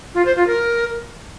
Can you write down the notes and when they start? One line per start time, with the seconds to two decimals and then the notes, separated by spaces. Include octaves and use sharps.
0.15 F4
0.25 C5
0.36 F4
0.47 A#4